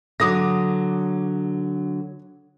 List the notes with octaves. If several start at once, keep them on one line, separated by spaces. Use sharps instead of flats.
D3 F#3 D6 D#6 A#6